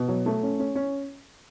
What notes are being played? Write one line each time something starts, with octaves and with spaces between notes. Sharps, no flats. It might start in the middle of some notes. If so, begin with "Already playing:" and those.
Already playing: B2
F#3
A3
C#4
C#4
C#4